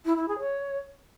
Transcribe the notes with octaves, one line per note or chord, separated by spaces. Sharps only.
E4
E4
G#4
C#5